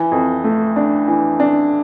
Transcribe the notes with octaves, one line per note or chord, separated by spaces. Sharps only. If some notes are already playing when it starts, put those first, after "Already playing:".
Already playing: E3
F2
A3
D4
E3
D4